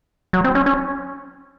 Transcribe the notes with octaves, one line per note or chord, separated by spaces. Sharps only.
F#3
C4
C#4
C#4